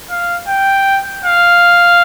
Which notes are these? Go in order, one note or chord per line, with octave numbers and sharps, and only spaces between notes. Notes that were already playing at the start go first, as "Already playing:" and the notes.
F5
G5
F5